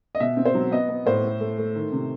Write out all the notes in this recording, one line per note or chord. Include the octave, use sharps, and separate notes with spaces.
D#5
B2 E5
C4
C5
F#3
B3 D#5
B3
A2 C5
A3
A3
A3
D#3
C3